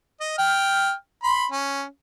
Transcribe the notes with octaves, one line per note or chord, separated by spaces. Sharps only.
D#5
G5 F6
B5 C6
C#4